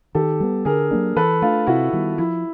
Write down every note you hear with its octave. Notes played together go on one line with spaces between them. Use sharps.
D#3 G4 A4
G3 B3
D3 G#4 A#4
F#3 A#3 D4
E3 A4 B4
A3 D4 F4
C3 E4 F#4
D#3 G3 B3
F3 E4